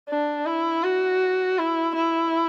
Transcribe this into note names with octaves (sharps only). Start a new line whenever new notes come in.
D4
E4
F#4
E4
E4